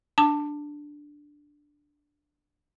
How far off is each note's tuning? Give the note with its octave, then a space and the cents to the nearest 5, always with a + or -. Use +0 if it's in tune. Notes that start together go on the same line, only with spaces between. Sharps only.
D4 +0 A5 +15